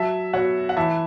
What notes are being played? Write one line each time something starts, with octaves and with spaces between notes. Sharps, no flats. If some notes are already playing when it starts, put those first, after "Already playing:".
Already playing: F#3 E5 A5
B2 C#5 F#5
F#5
E3 E5 A5